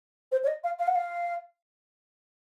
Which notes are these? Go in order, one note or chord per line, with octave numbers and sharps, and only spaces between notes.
C5
C#5
D#5
F5
F5
F#5
F5